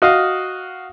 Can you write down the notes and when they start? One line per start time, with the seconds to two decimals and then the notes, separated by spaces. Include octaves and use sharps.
0.02 F#4 D#5 F5